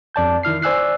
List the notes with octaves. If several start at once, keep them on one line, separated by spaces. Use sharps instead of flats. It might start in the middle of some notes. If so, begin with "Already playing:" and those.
F2 D5 A5 G6
D#3 E4 F6 C7
C5 D5 G#5 E6 F#6 C7